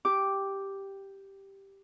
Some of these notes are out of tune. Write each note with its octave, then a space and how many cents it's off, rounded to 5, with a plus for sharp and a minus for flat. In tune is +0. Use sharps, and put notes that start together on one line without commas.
G4 +0 D6 +0